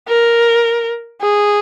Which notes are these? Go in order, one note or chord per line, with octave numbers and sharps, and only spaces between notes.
A#4
G#4